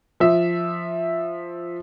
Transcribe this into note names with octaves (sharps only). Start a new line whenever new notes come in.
F3 E5